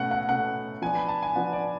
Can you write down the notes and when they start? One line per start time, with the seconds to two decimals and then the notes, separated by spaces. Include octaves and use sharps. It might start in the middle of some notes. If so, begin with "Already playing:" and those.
Already playing: B2 A3 C#4 F#5
0.11 F#5
0.28 B2 A3 C#4 F#5
0.82 F3 B3 D4 G#5
0.95 B5
1.08 A5
1.23 G#5
1.35 F3 B3 D4 F#5
1.53 D5